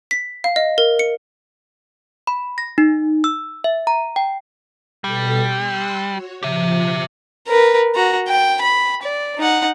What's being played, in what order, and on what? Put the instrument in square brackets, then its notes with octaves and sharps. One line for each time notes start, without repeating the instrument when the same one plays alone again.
[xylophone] B6
F5
D#5
A#4
C#7
[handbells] B5
A#6
D#4
E6
E5
A#5
G5
[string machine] B2 A4 B6 [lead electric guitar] G3
[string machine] C6 E6 F#6
F#4 C#5
[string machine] F3 [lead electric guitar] G4 E5
[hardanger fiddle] A#4 B4
F#4 A#5
G5
B5
D5
D#4 F#5